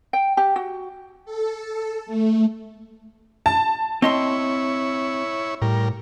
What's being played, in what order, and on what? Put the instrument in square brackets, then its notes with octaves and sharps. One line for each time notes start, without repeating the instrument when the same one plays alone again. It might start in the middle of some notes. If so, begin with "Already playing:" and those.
[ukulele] G5
G4
F#4
[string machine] A4
A3
[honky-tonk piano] A5
[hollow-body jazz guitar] C4 D#5 C6 [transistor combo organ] E4 C#5
[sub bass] A2 [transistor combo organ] G3 A#4